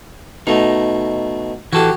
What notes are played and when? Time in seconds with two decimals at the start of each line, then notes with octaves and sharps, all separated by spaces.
0.47 B2 A3 D#4
1.73 E3 F#4 G4 A4